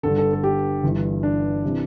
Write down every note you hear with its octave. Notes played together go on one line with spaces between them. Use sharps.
G1 G2 D3 A4
A4
A4
G4
G1 G2 E3
D4
C3 E3